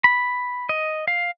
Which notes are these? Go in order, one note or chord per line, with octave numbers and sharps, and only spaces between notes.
B5
D#5
F5